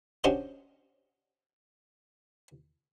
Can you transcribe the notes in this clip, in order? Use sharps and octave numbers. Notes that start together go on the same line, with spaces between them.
C#4 D4 F#4 G4 C5 D#5